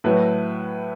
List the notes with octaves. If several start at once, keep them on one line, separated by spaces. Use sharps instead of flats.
A2 F#3 A3 E4 B4